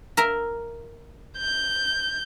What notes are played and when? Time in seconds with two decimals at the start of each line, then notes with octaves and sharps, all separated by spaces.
0.17 A#4 E5 A#5
1.37 G6